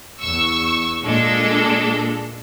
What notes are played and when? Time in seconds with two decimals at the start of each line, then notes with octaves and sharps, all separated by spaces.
0.20 E2 C#6 E6
1.05 A#2 G#3 D4 A4